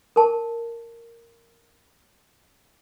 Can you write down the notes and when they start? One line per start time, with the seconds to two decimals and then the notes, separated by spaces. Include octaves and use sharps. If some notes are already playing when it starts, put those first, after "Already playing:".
0.16 A#4 A5